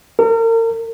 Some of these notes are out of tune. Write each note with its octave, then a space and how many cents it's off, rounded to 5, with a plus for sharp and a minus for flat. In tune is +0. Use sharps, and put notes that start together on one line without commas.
A#4 -35